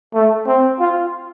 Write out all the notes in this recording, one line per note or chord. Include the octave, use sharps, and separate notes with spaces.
A3
C4
F4